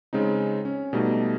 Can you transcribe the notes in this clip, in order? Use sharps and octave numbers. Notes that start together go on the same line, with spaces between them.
C#3 G#3 C4 D#4
C#4
B2 G3 A3 D#4